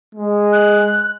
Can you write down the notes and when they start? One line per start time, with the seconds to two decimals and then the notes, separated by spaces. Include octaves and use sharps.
0.15 G#3
0.53 F#6